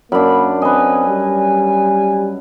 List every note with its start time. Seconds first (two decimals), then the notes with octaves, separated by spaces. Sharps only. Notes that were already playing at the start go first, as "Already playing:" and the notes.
0.12 F#2 A#3 D4 B5
0.62 C4 B4 D#5 G#5
1.07 G3